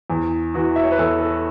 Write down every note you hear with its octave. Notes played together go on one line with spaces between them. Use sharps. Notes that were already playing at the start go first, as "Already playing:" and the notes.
E2
E3 F#4
E5
C#5
B4
E2 A4
A4